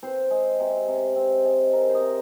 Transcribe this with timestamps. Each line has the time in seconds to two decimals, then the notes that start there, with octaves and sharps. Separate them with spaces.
0.03 C4 C5
0.31 G#3
0.60 C3
0.88 C3
1.16 C4
1.45 G#3
1.73 C3 A#4
1.89 C5
1.95 D#5
2.01 C3